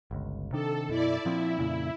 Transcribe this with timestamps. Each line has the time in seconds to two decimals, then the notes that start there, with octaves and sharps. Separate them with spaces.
0.11 G1 C#2
0.52 C3 D#3 D4 A4
0.89 F#2 B2 E4 D5
1.25 A#2 F3 C4 E4
1.59 F2 A#2 C#3